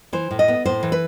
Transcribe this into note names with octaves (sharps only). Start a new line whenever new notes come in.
E3 C5
A2
D#5
B3
A2 C5
E3
B4